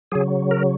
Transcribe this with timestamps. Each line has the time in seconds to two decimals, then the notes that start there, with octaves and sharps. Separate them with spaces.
0.12 C#3 F#3 G#4
0.51 A#4